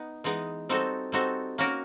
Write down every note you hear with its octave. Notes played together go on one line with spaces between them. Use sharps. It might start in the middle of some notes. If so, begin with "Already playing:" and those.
Already playing: B3 D#4
E3 G#3 B3 D#4
G3 C4 D#4 F#4 A4
G3 C4 D#4 F#4 A4
A#3 C#4 F#4 A#4